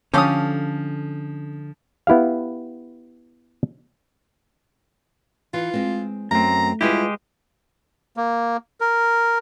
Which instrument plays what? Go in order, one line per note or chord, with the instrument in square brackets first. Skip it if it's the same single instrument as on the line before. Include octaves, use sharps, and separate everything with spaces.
[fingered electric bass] D3 [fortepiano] F3 D#6 [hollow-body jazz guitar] C#4 [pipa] G4 A4 F5
[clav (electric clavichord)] B3 E4 G4 F5
[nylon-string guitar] E3 [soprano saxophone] F4
[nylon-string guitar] G#3 C4
[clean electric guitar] F#2 C4 [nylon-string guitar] A3 [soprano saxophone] A#5
[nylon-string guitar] G3 F4 B4 [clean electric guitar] G#3 G4 [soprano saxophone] E4
[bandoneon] A#3
A#4